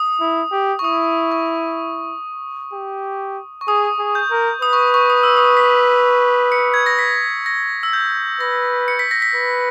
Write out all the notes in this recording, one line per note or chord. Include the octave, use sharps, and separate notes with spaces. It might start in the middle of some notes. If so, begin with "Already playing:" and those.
Already playing: D#6
E4
G4
C#6
E4 D#6
C#6
G4
C#6
G#4 D#6
G#4
G6
A#4
B4 D#6
C#6
C#6
D#6
E6
D#6
B6
C#7
G#6
A#6
B6
A#6
E6
G6
B4 A#6
C#7
B6
A#6
B6
B4